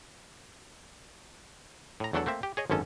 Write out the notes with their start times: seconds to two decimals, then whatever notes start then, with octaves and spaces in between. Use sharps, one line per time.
2.00 A2 A#5
2.13 E2 F#3 A3 D4 A4 F#5
2.26 A3 A#3 C4 E5
2.43 G4
2.57 G#4 C#5 D#5
2.70 G#1 F#2 D3 C#4 A4